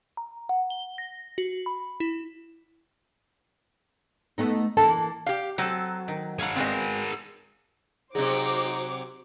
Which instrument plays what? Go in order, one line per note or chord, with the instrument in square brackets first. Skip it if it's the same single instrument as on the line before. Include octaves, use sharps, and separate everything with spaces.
[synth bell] A#5
F#5
G7
A#6
F#4
B5
E4
[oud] A3 B3 D#4
[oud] E3 A#3 A4 [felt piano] A5
[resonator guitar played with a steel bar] G4 F5
[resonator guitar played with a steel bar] F#3 [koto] C4 A4
[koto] D#3
[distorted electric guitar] G#4 A#4 [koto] C#5 F5 F#5
[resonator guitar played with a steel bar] G#3 C4 [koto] B3 F4 F#4
[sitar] C3 F#3 [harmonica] D#4 [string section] F#4 C5 D6 [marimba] G#4